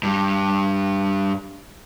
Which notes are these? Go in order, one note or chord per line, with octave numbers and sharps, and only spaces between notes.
G2 G3